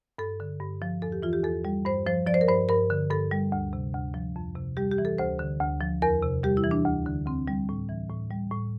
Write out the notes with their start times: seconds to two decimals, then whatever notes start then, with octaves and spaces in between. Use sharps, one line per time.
0.18 G2 A4
0.40 D3
0.60 G2
0.82 F3
1.02 E2 A4
1.12 G4
1.22 E3 F4
1.33 G4
1.43 E2 A4
1.65 G3
1.85 G2 C5
2.06 F3 C5
2.27 F3 D5
2.34 C5
2.41 A#4
2.48 G2 C5
2.69 G2 A#4
2.90 D3
3.10 G2 A4
3.31 G3
3.52 D2
3.73 C3
3.94 D2
4.14 F3
4.36 F2
4.56 C3
4.77 G3 G4
4.91 G4
4.98 E3
5.05 A4
5.18 D2 C5
5.39 D3
5.60 D2
5.81 F3
6.02 E2 A#4
6.23 C3
6.43 G3 G4
6.57 E4
6.64 E3
6.71 D4
6.86 D2
7.06 D3
7.26 D2 C4
7.48 G3
7.69 A2
7.89 E3
8.10 A2
8.30 G3
8.52 A2